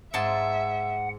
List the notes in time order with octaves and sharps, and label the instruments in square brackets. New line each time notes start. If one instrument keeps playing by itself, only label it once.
[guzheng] G#2 A5 C6 [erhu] E5 [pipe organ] F#5